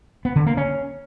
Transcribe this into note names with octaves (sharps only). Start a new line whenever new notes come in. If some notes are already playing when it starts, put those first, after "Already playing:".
B3
D3
A#3
C#4